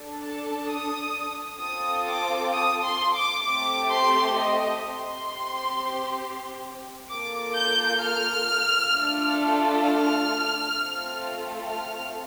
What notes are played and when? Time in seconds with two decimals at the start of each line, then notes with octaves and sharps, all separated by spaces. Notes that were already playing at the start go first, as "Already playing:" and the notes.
Already playing: D4 A4
0.24 A5
0.69 D#6
1.61 C4 F4 A4 D#6
2.07 D6
2.53 D#6
2.84 C6
3.14 D6
3.44 A3 C4 G4 D6
3.90 C6
4.35 D#5
4.82 C6
5.27 C4
5.32 G4
7.10 A#3 F4 A4 D6
7.56 G6
8.02 F6
8.93 A3 D4 F4 A4
9.85 F6
10.76 A3 C4 F4 A4
11.68 F6